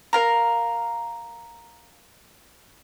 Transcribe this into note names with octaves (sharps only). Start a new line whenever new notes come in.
A#4 F5 A#5